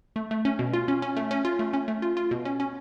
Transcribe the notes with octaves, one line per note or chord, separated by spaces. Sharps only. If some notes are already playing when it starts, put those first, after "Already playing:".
A3
A3
C#4
B2
F4
C#4
C#4
A3
C#4
F4
A3
C#4
A3
F4
F4
B2
C#4
C#4